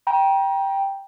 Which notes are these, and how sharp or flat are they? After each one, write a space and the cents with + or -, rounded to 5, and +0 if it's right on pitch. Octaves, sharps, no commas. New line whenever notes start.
G5 +0 A#5 +35